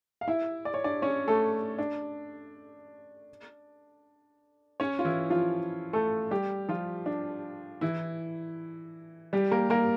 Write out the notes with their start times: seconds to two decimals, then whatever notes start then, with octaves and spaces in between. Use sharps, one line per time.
0.21 F5
0.28 E4 E5
0.65 D5
0.74 C#5
0.84 D4 D5
1.02 C#4 C#5
1.28 A3 A4
1.79 D4
4.80 C#4 C#5
4.99 F4
5.05 E3 E4
5.30 F3 F4
5.93 A3 A4
6.31 G3 G4
6.69 F3 F4
7.06 D4
7.81 E3 E4
9.33 G3 G4
9.51 A#3 A#4
9.70 A#3 A#4